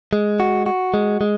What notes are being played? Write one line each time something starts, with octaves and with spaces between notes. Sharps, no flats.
G#3
F#4
F#4
G#3
G#3